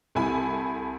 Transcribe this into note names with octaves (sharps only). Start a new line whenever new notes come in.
C2 E4 A4 G#5 B5